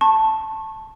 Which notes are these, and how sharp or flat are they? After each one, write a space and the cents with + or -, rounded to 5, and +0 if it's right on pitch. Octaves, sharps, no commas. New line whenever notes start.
A5 +0 C#6 -30